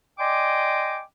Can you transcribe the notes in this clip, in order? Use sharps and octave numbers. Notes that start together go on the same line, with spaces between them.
D5 D#5 G5 G#5 C6 D6